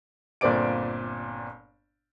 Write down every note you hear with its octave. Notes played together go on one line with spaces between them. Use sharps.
G1 A#2 C4 D5 D6 D7